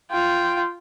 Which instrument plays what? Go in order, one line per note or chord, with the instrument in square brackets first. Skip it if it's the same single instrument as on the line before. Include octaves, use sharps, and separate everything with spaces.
[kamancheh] F4 G5